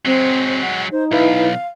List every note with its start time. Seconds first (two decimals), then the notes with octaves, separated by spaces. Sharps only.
0.05 F#3 G#3 C4 C5
0.61 F#5
0.91 D#4 C5
1.12 B1 E4 B4 F5